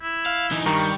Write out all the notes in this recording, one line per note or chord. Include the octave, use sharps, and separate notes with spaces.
E4
F5
E3 D#4
G2 D#3 G3 A#5 C#6